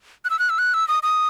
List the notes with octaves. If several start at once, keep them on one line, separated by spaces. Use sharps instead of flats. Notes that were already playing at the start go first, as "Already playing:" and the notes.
F#6
E6
F#6
E6
F#6
E6
D#6
D#6